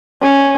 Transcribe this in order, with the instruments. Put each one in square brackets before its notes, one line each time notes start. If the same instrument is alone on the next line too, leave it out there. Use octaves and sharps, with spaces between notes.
[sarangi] C#4